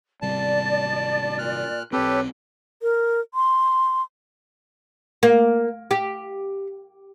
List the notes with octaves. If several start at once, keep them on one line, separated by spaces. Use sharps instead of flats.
G#1 C3 G3 D5 A5
A#2 F6 F#6
B1 C4 G4 A4 B4 C#5
A#4
C6
A#3
G4